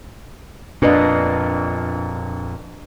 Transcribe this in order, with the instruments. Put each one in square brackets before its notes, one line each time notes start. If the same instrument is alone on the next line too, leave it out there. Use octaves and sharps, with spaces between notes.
[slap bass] F2 A#2 [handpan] D4 B4 D#5